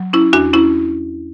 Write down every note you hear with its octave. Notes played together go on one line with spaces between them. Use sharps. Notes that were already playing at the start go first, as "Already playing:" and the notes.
Already playing: F#3
C#4 E4
E2 D4 F#4
C#4 E4